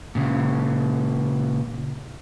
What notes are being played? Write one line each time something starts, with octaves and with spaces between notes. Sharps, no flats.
A#2 C#3